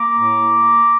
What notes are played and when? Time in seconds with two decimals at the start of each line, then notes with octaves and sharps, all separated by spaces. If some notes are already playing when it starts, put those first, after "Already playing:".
Already playing: A#3 A#5 D6
0.14 A2
0.39 A#3
0.63 A#3